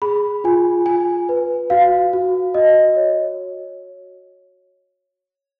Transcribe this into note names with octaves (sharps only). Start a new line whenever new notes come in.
G#4 B5
F4 G#5
F4 G#5
B4
F#4 F5
F#4
F#4 D#5
C#5